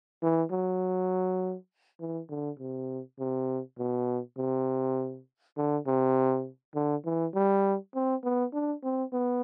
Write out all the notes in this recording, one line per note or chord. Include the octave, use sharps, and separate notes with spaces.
E3
F#3
E3
D3
C3
C3
B2
C3
D3
C3
D3
E3
G3
C4
B3
D4
C4
B3